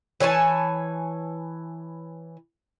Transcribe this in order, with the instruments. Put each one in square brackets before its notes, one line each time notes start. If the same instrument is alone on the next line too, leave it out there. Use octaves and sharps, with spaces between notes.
[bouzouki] E3 C#5 G#5 A5